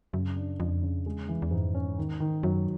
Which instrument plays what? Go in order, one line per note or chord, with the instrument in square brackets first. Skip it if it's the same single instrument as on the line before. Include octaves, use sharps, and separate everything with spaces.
[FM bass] F#2 [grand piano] C#3
[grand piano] D4
[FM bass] F2 [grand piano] D4
[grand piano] C#3
[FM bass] E2 [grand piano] G#3
[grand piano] E3
[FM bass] E2
[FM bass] F2 [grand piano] G#2
[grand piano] C#4
[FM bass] E2 [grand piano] D#3
[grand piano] D#3
[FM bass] F#2 [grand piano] F#3